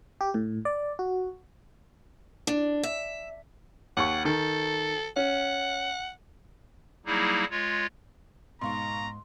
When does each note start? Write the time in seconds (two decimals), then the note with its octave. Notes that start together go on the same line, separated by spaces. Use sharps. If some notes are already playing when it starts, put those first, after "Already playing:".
0.21 G4
0.34 A2
0.65 D5
0.99 F#4
2.47 D4
2.83 E5
3.97 D#2 F#5 C#6
4.25 D#3 A4
5.16 C#4 F#5
7.06 F#3 G3 A#3 D#4 E4 G#4
7.50 G#3 F4 C#5
8.61 G#2 B2 F5 A#5 C6 C#6